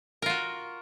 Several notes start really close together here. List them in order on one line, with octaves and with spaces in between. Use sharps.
A#4 F4 F#4